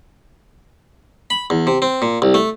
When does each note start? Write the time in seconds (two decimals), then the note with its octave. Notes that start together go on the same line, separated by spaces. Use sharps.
1.30 B5
1.50 E2
1.67 C3
1.82 C4
2.02 A#2
2.22 C2
2.34 A3